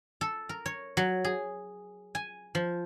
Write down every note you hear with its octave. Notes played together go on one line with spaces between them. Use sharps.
A4
A#4
C#5
F#3
G#4
G#5
F3